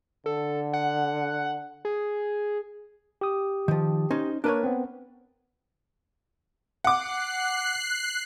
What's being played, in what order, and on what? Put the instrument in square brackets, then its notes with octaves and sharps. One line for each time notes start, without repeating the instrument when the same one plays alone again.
[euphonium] D3 [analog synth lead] A4
[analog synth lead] F#5
G#4
[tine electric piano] G4 D#6
[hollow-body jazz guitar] D#3 F3
C#4 D#4 C5
[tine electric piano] A#3 A#4 [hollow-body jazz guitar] D4 B4 C#5
[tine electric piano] B3 C4
[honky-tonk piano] F#5 D6 [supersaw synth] F#6 C7